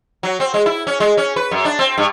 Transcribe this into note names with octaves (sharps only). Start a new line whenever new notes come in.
F#3
C4
G#3
E4
C#4
G#3
C#4
B4
F#2
D4
C4
G2